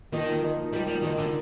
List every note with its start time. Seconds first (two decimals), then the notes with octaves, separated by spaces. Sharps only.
0.12 D#3 F3 A#3 D#4
0.42 F3 A#3 D#4
0.72 F3 G3 A#3 D#4
0.87 G3
1.02 D#3 F3 A#3 D#4
1.17 D3